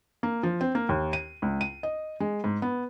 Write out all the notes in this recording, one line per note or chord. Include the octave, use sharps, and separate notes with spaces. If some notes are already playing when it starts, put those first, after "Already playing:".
A#3
F3
C4
A#3
D#2
D#7
C#2
D#7
D#5
G#3
G#2
B3